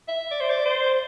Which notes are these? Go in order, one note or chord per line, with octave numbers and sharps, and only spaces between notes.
E5
D5
C5
D5
C5